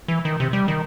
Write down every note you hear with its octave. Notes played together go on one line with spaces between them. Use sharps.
E3
D#3
C3
G3
D#3